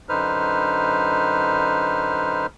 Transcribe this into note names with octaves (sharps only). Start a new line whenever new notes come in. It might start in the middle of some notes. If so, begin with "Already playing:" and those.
F#2 D3 D#4 B4 C5 F6